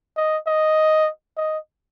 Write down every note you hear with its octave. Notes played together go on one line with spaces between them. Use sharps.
D#5
D#5
D#5